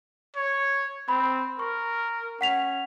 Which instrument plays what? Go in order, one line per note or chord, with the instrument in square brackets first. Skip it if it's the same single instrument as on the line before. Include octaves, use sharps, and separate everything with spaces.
[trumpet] C#5
[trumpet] C4 [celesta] B5
[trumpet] A#4 [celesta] C#6
[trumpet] C#4 [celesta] F#5 B6 F7